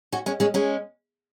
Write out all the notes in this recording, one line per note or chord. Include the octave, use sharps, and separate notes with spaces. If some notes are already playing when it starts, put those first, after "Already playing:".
C#4 F#4
G#3 C#4
G#3 C#4
G#3 C#4